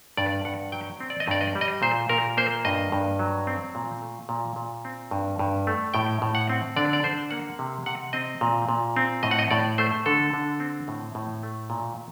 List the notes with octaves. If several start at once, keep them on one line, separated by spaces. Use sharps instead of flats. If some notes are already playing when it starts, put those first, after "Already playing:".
G2 D5
G2 F#5
F#3 G5
C4
D5
D#5
G2 D5
D#5
G3
D#5
A#2 C5
A#2 A#4
A#3 C5
G2 D#5
G2
F#3
C4
A#2
A3
A#2
A#2
C4
G2
G2
A3
A2 G5
A2
F#5
C4
D3 D5
D5
D3 C5
A#3 F#5
C3
C3 F#5
C4 D#5
A#2
A#2
C4
A2 D#5
F#5
D#5
A2 D5
A3 C5
D3 A4
D3
C4
A2
A2
A3
A#2